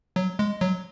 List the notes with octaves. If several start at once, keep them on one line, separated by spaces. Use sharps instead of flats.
F#3
G#3
F#3